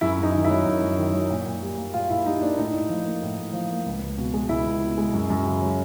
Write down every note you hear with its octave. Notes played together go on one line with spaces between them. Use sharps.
F#2 E4
F#2 D#4
D#3
E4
F#3
F#2
F#2
D#3
F#3
A#2
A#2
G3
A#3
A#2 F4
A#2 E4
G3 D#4
A#3 D4
A2 D#4
A2
F3
A#3
A2
A2
F3
A#3
C#2
C#2
B2
G#3
C#2 E4
C#2
B2
G#3
F#2
F#2
C#3
F#3